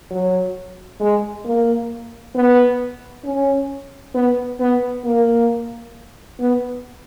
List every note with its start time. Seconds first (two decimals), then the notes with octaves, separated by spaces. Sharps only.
0.11 F#3
1.00 G#3
1.45 A#3
2.35 B3
3.25 C#4
4.15 B3
4.60 B3
5.05 A#3
6.40 B3